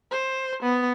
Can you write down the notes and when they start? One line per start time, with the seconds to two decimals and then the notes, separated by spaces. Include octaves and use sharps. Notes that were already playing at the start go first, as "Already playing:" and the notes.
0.11 C5
0.63 B3